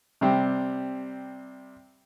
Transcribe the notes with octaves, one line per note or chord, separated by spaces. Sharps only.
C3 G3 C4